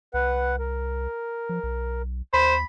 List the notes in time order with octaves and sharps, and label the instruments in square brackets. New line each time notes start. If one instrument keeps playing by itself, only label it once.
[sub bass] C2 [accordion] B4 F#5
[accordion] A#4
[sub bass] F3
B1
[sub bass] D#2 [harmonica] C5 [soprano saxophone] B5